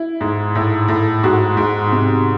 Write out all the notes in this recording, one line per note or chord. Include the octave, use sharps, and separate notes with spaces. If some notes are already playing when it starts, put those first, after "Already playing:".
Already playing: E4
G#2
A2
A2
G#2 F#4
G#2
C3